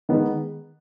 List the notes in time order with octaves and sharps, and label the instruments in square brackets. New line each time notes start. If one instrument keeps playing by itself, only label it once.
[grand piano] D#3 G#3 B3